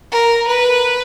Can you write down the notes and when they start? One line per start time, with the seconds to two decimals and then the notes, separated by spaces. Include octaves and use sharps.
0.12 A#4
0.48 B4